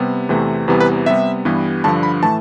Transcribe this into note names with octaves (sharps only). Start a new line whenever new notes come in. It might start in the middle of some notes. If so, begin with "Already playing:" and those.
Already playing: C3 G3 B3
E2 C3 E3 A3
E2 C3 E3 G3 B3
B4
C3 G3 B3 E5
G2 E3 G3 B3
G2 D3 F3 A5
B5
A2 E3 A3 A5